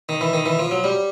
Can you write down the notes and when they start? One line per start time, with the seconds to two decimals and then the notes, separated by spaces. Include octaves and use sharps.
0.09 D#3
0.21 E3
0.33 D#3
0.46 E3
0.59 F3
0.71 F#3
0.84 G3